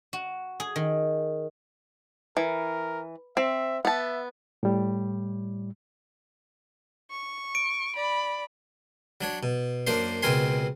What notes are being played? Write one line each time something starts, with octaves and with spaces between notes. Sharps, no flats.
F#4
G#4
D#3
E3 A#4
C4 E5
B3 E5 A5
A2 G3
C#6
D7
D5 B5
F#3 D4 C#5
B2
F#2 A#3 D4 C5 C6
C#2 B2 C4 A#4 G#5 C6